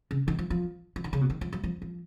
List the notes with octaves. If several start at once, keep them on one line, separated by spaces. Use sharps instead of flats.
C#3
D#3
F3
F3
F3
D#3
C#3
B2
D#3
F3
F#3
F3
F3